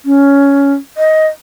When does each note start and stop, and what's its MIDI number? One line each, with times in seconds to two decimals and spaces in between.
0.05 0.72 61
0.97 1.27 75